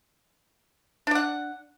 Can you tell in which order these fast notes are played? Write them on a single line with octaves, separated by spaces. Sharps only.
D4 D5 F#5